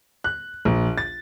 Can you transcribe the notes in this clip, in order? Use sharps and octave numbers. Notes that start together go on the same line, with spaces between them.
F#6
A#1
A6